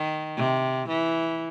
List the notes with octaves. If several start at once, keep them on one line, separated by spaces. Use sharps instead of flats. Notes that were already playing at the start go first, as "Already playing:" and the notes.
Already playing: D#3
C3
E3